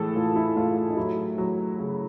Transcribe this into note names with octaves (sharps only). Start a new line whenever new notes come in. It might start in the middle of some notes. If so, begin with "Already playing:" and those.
Already playing: A2 E3 G#4 A4
A2 F4
E4
A2 F4
F4
D#4
F#3 E4
F#3
C#3